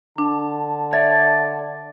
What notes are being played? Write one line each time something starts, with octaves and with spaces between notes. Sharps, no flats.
D3 D4 A5
C#5 D5 E5